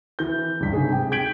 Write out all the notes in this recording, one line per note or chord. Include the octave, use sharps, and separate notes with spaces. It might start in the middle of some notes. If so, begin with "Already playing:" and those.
E3 G6
C#2 G2 B6
G#2 C3 G#4
G5
G6 G#6 B6 D7 F#7